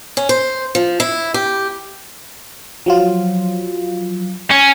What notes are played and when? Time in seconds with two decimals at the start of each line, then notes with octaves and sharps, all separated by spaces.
0.17 C#4
0.29 C5
0.75 F3
1.00 E4
1.34 G4
2.86 F3 F#3 F4
4.50 C#4